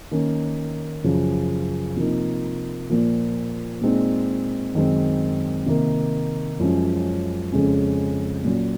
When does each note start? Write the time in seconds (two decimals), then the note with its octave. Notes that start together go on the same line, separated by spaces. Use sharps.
0.11 D#3 A#3 C#4
1.04 F#2 C#3 F3
1.96 C3 F3 A#3 D#4
2.89 A#2 F3 A#3
3.81 A#2 G#3 C4 D#4
4.74 F#2 D#3 G#3 C4
5.66 C3 D#3 A#3
6.59 F#2 F3 G#3 C#4
7.52 F2 C#3 G#3 C#4
8.44 A#2 F#3 C#4